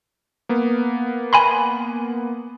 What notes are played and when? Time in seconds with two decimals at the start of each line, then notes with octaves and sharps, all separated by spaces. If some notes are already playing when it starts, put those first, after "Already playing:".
0.49 A#3 B3
1.33 G#5 B5 C6